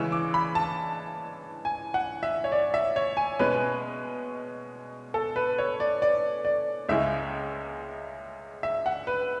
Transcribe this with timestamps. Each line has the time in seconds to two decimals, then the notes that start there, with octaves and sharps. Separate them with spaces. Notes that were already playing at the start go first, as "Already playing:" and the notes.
Already playing: C#3 E3 G#3 C#4 E6
0.12 D6
0.34 B5
0.55 A5
1.65 G#5
1.94 F#5
2.23 E5
2.44 C#5
2.52 D5
2.74 E5
2.96 C#5
3.17 G#5
3.39 B2 G#3 C#4 B4
5.14 A4
5.36 B4
5.58 C#5
5.80 D5
6.02 D5
6.45 D5
6.89 C#2 C#3 G#3 C#4 E5
8.63 E5
8.86 F#5
9.07 B4